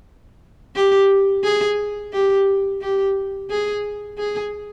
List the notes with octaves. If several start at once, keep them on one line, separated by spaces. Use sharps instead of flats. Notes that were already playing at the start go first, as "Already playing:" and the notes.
G4
G#4
G4
G4
G#4
G#4